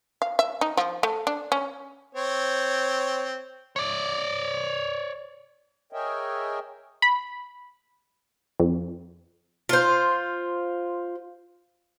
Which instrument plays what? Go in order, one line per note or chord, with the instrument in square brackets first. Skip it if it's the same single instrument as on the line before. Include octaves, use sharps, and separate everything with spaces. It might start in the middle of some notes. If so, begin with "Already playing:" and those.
[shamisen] F5
E5
D#4
F3
A3
D4
C#4
[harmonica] C4 C#5
[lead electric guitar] C#5 D5
[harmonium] G#4 A#4 C#5 D#5 E5 G5
[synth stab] B5
F2
[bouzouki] F4 C5